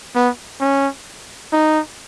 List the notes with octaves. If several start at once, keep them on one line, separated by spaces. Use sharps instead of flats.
B3
C#4
D#4